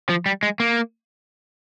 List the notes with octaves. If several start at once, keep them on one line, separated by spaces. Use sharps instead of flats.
F3
G3
G#3
A#3